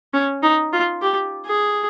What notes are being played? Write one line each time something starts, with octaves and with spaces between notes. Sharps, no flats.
C#4
D#4
F4
G4
G#4